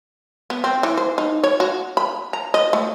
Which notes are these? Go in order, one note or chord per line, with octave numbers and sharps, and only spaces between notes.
B3
C4
E3
C5
D#4
C#5
F#4
B5
A#5
D#5
A3